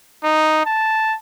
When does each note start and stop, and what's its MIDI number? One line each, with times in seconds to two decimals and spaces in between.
0.24 0.61 63
0.66 1.16 81